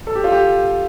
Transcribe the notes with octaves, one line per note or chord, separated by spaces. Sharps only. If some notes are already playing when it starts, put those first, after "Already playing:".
A4
G4
F4
G4